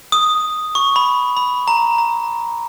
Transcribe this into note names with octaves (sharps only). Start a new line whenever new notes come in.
D#6
C#6
B5
B5
A#5
A#5